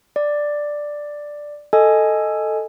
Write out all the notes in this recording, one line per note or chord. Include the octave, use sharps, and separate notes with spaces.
D5
A4 D#5 G#5